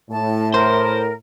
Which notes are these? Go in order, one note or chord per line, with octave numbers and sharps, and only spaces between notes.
A2 A5
A#4 C5